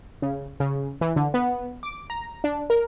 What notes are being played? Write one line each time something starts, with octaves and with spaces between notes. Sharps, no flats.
C#3
C#3
E3
D3
B3
D6
A#5
D4
A#4